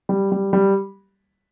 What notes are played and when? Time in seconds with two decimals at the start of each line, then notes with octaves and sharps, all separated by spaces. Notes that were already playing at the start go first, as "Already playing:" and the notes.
0.09 G3
0.32 G3
0.53 G3